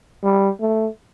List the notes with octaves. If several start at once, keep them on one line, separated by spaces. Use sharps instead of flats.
G3
A3